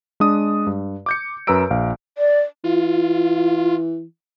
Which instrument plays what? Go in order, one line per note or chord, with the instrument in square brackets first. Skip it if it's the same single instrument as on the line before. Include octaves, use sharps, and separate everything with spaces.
[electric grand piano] G#3 D4 D#6
G2
D6 G6 C#7
F#2 B4 A#5 E6 D7
A#1 F5
[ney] D5
[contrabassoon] E3 [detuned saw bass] F4